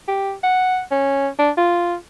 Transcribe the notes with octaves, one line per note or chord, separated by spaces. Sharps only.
G4
F#5
C#4
D4
F4